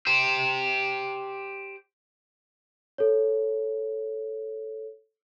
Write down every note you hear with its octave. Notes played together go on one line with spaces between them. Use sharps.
G4 C5
A4 C#5